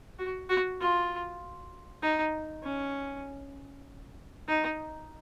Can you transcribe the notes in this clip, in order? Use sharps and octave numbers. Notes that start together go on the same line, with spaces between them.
F#4
F#4
F4
D#4
C#4
D#4